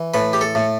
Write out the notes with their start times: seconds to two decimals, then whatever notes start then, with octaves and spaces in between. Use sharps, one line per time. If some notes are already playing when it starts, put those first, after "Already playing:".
Already playing: E3
0.14 A2 B4
0.33 G4
0.41 A4
0.55 A2